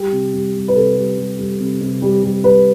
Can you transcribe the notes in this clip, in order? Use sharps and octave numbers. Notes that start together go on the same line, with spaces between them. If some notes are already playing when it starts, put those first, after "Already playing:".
Already playing: G3 G4
C3
G3
G3
B4
C3 A4
G3
G3
G3
C3
C3
G3
G3
G3 B4